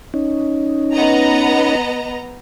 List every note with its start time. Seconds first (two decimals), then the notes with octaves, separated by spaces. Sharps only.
0.14 C#4 D#4
0.92 B3 D#5 A#5